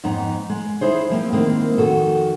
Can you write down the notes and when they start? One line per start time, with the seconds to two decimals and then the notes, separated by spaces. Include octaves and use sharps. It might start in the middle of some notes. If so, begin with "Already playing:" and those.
0.04 F2 G#2 B3 D#4 A#5
0.50 G#3
0.81 D#4 E4 G#4 C5
1.10 F3 A#3 C4
1.33 D#3 G#3 A#3 C4 E4
1.78 F2 D#3 F#4 A4